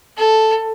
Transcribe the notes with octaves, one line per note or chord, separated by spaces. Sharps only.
A4